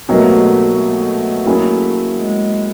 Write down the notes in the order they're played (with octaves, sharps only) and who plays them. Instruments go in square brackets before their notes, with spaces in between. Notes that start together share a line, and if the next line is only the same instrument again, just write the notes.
[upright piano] C2 B2 F#3 A#3 D#4 [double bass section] A3
[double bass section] A3
[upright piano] F#3 A#3 C#4 E4 G#4
[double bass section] G#3